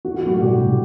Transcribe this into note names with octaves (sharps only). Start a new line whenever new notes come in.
E3 F#4
G4
F#3 A3 F#4
C3 G3 G4
C3